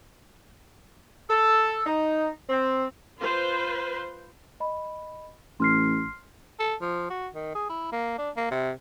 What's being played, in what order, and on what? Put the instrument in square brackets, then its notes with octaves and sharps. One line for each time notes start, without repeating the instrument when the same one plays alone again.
[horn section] A4
D#4
C4
[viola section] F4 B4 C5
[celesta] D#5 B5
[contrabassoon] A1 [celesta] C6 F6 C7
[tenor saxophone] A4
F3
F#4
D#3
G#4
E4
A#3
D4
A#3
C3